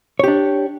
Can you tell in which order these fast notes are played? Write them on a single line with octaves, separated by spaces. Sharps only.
C#5 G4 D4